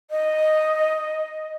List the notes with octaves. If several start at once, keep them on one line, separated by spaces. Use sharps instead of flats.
D#5